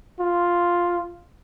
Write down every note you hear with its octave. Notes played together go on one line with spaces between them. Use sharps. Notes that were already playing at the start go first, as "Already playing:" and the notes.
F4